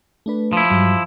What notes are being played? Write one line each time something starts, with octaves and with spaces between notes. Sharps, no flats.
A3 D4 B4
F3 E4
G2 F#3